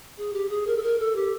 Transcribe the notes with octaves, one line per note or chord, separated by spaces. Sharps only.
G#4
G4
G#4
A#4
A4
A#4
A4
G4